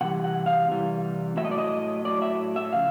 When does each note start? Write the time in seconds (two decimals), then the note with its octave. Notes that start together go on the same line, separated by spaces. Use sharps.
0.01 C3 E3 G3 F#5
0.24 F#5
0.46 F5
0.68 C3 E3 G3
1.37 A2 F#3 A3 E5
1.45 D#5
1.51 D5
1.58 D#5
2.05 A2 F#3 A3 D5
2.22 E5
2.56 E5
2.73 C#3 F3 F5